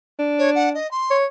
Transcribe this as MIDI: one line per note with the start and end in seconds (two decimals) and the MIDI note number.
0.19 0.76 62
0.39 0.50 73
0.55 0.69 78
0.74 0.89 75
0.91 1.16 84
1.11 1.26 73